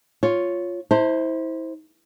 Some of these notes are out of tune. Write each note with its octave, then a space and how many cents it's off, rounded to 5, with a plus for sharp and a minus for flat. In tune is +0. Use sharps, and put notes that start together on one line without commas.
F4 +5 C#5 +0
E4 -30 C5 +0 A5 +35